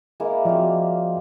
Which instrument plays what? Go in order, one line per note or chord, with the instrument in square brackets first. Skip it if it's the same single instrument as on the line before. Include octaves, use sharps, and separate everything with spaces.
[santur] G#3 A#3 E4
[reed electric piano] F3 F#4 D5 [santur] C4 F5